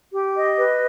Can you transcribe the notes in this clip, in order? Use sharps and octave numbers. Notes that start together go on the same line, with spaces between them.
G4
D#5
B4